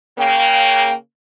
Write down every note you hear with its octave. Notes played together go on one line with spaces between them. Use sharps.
C#3 A#3 G5